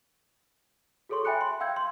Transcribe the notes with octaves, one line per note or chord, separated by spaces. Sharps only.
F#4 G#4 A4 C#5 C6 C#6
E5 G5 G#5 B5 F#6 C#7
C6
F5 G5 E6 G6 G#6
C6